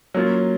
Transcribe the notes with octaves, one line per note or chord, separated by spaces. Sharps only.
F#3 A#3 C#4 F4